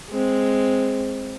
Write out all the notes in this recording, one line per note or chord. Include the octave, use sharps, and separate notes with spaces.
G#3 C4